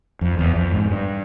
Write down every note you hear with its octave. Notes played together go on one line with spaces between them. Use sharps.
F2
E2
F2
G#2
G2